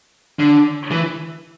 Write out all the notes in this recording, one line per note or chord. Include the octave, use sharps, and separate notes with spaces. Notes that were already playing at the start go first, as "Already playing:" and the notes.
D3
E3